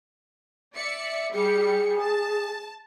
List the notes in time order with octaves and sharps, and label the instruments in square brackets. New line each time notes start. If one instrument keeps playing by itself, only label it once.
[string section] D5 E5 C#7
[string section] G3 G4 C#7 [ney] G#4
[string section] A5